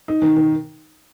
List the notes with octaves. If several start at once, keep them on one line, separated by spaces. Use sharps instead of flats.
D#4
D#3
D#3